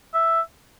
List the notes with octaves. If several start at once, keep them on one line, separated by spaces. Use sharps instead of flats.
E5